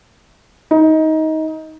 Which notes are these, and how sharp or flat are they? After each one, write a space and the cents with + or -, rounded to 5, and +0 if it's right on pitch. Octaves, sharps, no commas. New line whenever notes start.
D#4 +20